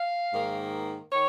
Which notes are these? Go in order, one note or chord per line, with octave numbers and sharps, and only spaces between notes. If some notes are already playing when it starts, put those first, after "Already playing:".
Already playing: F5
G#2 D#3 A#3
D#3 C#5